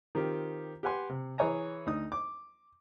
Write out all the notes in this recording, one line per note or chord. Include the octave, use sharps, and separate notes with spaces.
D#3 C4 F4 G4
G4 B4 F#5 G#5 C6
C3
E3 G#4 C#5 G#5 A#5
D2 D#4 D#6
D6